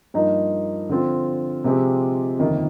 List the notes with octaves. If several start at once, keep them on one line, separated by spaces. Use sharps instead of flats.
G2 F3 A#3 D#4
D3 F3 C4 F4 C5
C3 F3 G#3 C4 G4
G1 F2 D#3 A#3